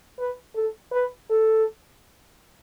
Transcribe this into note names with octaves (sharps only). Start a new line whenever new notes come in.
B4
A4
B4
A4